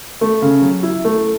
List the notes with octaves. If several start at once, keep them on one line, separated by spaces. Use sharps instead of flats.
A3
C#3
F#3
E4
A3